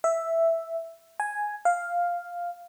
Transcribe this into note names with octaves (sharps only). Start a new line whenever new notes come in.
E5
G#5
F5